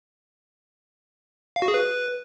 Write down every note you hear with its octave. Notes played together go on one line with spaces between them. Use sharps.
F5
F#4
G#4
B4